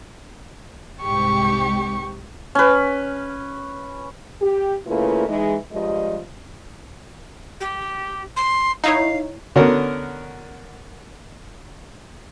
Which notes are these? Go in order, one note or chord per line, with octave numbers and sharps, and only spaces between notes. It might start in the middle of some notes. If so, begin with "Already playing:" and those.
C2 G#2 G4 C#6
C#4 B4
G4
C#3 A3 A#3 E4 F4 B4
E3 G#3 D#4
G2 F3 G3 G#3 D#5
G4
C6
D#4 E4 C#5 F5
D3 B3 C#4 F#4 A#4